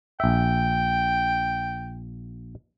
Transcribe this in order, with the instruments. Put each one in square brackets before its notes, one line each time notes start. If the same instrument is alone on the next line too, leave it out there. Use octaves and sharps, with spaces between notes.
[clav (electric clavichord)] A#1 E5 [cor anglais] G5